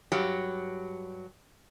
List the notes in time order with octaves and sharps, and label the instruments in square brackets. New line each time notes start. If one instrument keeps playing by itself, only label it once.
[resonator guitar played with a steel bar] G2 F#3 G4